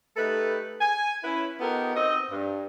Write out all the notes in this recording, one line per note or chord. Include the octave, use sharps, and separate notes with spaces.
A3 D#4 G4 A4 B4
G#5
C#4 E4 B4
B3 D#4 F4 G4 A4 A#4
C4 D#4 F#4 D#5
G2